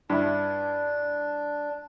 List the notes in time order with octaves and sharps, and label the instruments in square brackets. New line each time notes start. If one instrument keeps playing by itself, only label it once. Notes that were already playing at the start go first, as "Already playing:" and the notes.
[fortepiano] G2 E4 [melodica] D4